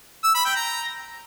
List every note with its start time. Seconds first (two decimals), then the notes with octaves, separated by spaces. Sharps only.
0.24 E6
0.35 B5
0.45 G5
0.56 A#5